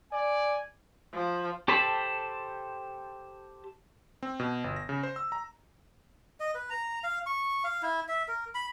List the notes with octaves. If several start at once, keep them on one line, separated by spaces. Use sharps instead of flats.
D5 G#5
F3
G4 A4 C5 A5 B5
C4
B2
G1
A#6
C#3
C5
E6
A#5
D#5
B4
A#5
F5
C#6
F5
E4
E5
A#4
B5